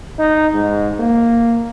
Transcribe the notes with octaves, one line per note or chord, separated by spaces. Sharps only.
D#4
G#2
A#3